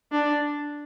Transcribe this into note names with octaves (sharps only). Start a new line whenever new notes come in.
D4